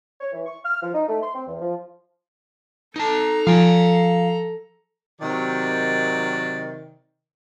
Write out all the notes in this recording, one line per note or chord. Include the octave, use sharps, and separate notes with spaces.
C#5
E3
C#6
F6
F3
D#4
A3
C6
C4
E2
F3
D#4 A4 A5 A#5
F3 F5 G#5
C3 D#3 F#3 D5